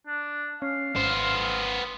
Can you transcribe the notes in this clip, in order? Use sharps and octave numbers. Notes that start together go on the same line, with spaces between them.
D4
C#4 F5
G#1 B3 C5